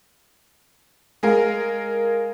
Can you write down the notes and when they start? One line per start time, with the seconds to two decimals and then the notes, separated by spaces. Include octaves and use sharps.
1.23 G#3 G#4 A#4 F5